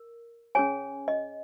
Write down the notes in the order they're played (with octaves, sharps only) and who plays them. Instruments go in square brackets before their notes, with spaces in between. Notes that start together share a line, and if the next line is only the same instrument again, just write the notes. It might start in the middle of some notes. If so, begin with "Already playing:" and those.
Already playing: [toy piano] A#4
C#4 G#4 C#5 G#5
D#5